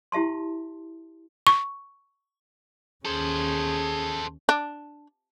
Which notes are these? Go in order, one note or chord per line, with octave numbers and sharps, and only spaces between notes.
E4 G4 E5 A5 C6
C#6
D#2 C#4 G#4 A4 C5
D4